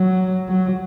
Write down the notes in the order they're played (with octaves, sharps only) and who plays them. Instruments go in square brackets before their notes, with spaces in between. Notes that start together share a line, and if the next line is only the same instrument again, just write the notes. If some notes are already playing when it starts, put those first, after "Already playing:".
Already playing: [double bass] F#3
F#3